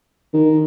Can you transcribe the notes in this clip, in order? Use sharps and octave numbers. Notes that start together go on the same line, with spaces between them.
D#3